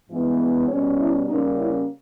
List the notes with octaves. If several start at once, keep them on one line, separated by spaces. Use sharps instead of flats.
G2 E3 G#3 B3
B2 G3 C#4 C#5
E4
C#3 G3 A#3 C#4 D#4
E4